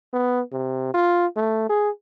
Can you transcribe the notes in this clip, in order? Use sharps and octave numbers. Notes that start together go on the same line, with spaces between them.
B3
C3
F4
A3
G#4